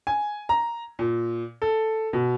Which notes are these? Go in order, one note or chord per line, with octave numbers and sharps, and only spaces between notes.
G#5
A#5
A#2
A4
B2